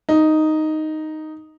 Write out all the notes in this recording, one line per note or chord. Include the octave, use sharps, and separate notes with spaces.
D#4